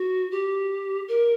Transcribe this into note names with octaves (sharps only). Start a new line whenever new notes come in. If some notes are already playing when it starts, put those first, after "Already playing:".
Already playing: F#4
G4
A#4